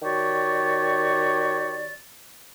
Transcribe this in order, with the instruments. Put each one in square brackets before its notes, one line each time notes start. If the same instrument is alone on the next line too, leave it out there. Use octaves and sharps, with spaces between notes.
[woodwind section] D#3 F#4 G4 C#5 D5